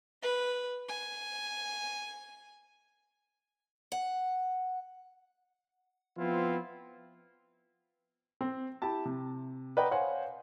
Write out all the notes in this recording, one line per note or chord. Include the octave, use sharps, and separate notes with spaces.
B4
G#5
F#5
F3 B3 C4 E4 F4
C4
E4 G4 A5
C3
B4 D5 D#5 F#5 G5 A#5
C5 C#5 F5 F#5 G#5